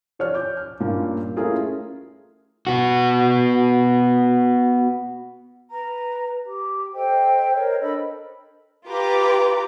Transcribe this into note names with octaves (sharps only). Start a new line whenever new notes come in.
F3 C#5 D5 F6
D6 G6
F6
G2 A#2 A#3 C#4 F4
A3 C#4 E4 F4 G#4 A#4
B3 F#4
B4 A#5
G4
A4 C5 D#5 G5
A#4 C5 C#5 D#5
D4 A4 D#5 B5
F4 G4 B4 A#5 D6